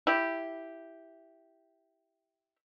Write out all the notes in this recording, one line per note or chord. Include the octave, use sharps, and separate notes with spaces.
E4 G4